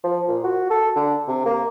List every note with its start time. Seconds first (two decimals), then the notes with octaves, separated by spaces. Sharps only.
0.04 F3
0.28 A#2
0.44 F#4
0.70 A4
0.96 D3
1.28 C3
1.46 A#3